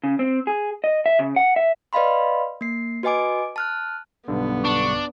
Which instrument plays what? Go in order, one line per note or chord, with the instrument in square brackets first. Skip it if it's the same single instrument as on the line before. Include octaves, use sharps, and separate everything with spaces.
[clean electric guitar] C#3
C4
G#4
D#5
E5
C#3
F#5
E5
[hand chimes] B4 D5 D#5 F5 B5 C6
A#3 C7
F#4 B4 D#5 G#5 D6 D7
A5 F6 F#6
[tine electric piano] B1 G2 D3 [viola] B3
[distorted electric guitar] D4 [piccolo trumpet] C#6